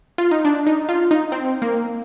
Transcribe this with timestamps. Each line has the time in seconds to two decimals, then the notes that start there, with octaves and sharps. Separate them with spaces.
0.18 F4
0.31 D#4
0.45 D4
0.67 D#4
0.89 F4
1.11 D#4
1.32 C4
1.62 A#3